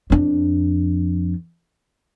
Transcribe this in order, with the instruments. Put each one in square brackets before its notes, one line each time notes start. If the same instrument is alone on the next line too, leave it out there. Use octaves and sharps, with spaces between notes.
[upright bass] F2 D4